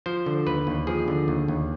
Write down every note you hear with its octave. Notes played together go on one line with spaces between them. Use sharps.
F3 C5
D3
D#2 B4
D#2
F3 G#4
D3
D#2
D#2